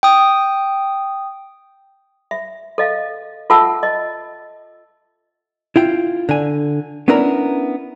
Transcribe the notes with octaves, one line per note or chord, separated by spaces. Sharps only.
G5 D#6
E5
A4 D#5 F5
F4 A4 E5 F#5 A5 E6
D#5
E4 F4 G5
D3 G#5
B3 C#4 D4 E4 A#4 A#5